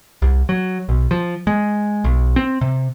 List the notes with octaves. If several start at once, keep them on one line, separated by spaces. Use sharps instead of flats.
C2
F#3
B1
F3
G#3
B1
C4
C3